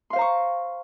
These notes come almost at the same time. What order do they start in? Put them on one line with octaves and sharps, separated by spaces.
C6 F5 C5 A#5 C#6